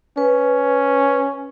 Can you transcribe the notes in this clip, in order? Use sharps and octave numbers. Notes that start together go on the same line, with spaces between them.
C#4 B4